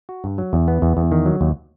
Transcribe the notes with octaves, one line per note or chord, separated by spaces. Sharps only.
F#4
G2
F#3
E2
B3
E2
E2
D#3
F#3
D#2